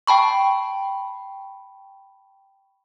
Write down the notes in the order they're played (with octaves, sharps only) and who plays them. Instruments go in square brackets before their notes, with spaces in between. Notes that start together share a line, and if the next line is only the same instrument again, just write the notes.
[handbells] G5 A5 B5 C#6